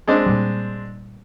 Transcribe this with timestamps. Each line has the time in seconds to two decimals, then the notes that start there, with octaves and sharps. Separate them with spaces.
0.07 G#3 C4 D4
0.26 A#2 G3